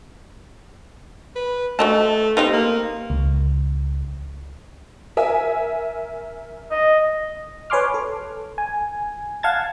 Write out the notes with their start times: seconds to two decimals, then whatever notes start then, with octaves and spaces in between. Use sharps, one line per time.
1.35 B4
1.79 A3 F#4 D#5 A5
2.37 B3 C4 D#4 G4
2.53 A#3
3.10 C#2
5.17 A#4 E5 G#5
6.71 D#5
7.70 B4 C#5 G#5 C6 D6 F6
7.94 A4
8.58 G#5
9.43 F5 F#5 A5 G#6 A6